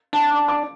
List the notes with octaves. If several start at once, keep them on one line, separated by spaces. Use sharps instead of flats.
D4 A5
D6